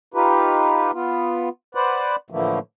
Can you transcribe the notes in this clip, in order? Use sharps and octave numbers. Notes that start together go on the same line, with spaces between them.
D#4 F4 G4 B4
B3 F4
B4 C5 D5 F#5
A2 D3 E3 F3 A3 A#3